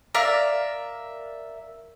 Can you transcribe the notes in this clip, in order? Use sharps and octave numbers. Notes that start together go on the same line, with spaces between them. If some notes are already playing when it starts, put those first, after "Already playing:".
A#4 D5 E5 F5